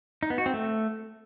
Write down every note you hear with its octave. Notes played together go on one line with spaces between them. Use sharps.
D#4
B3
F#4
C4
A3